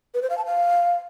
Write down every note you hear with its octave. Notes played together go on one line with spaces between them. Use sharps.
B4
C5
F5
A5
F5